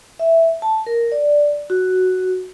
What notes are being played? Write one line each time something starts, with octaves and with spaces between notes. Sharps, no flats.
E5
A5
A#4
D5
F#4